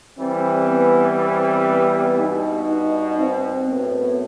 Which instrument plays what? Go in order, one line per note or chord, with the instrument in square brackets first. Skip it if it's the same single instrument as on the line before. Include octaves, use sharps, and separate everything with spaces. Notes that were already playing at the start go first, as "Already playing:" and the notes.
[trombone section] E3 G3 [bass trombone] C4
[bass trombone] B3
C4
B3
[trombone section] G2 B2 [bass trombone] D#4
[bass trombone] D#4
C4
[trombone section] F#2 A2 [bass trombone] B3